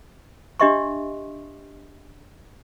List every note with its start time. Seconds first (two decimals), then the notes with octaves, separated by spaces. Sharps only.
0.60 D4 G4 D#5 E5 C6 C#6